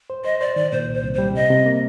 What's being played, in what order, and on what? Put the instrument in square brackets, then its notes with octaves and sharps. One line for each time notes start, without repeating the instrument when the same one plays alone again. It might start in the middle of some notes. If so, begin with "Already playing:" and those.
[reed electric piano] C5
[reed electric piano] C5 [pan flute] D#5
[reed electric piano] C5 [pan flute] D5
[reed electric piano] D#3 [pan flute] D5
[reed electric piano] A#2 [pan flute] C5
[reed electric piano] C2
[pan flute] C5
[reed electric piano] C2
[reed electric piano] G3 [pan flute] C5
[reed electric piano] C3 [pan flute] D#5
[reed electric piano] C3
A#3